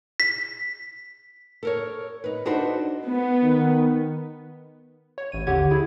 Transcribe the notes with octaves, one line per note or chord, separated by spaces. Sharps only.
B6
A4 A#4 C#5
D#4 B4
D4 D#4 F#4 A4 B4 C5
B3
D#3
C#5
A1 D#7
D#2 D3 G4 C#5 F#5 G#6
E4 G#4